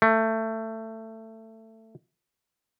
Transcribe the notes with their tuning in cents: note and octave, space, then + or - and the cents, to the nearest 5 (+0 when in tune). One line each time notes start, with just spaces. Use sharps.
A3 +20